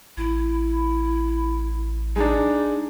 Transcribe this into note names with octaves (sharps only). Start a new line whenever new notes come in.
A1 E4
G#3 D4 D#4